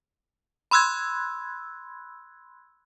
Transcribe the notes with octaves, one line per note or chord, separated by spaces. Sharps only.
B5 C6 E6 F#6 G#6